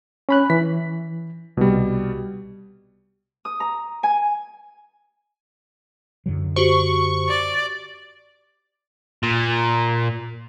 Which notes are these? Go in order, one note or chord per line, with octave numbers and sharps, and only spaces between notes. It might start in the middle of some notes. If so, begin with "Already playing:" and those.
C#4 B5 F#6
E3 B6
C2 B2 G3
D#6
A#5
G#5
F#2 D3 F#3
F#4 G4 C5 C#6
D5
A#2